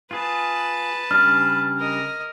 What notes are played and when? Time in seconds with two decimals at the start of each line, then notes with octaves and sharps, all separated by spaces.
0.11 F4 G#4 B4 A5
1.11 C#3 G3 D4 F6
1.79 A#4 D#5